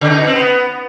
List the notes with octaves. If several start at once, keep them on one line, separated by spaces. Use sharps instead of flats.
C#3
D#4
B2
C4
B3